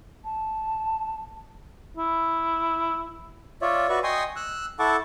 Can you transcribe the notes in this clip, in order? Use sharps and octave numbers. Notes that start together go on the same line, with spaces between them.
A5
E4
F4 C#5 D5 E5
F#4 B4 D5 E5 C#6
D#5 G5 G#5 C6 C#6 D#6
E6 F#6
E4 A4 F#5 A5 C#6 D6